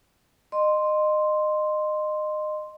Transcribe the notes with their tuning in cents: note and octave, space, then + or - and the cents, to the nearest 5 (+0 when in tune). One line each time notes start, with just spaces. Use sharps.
D#5 -25 C6 +0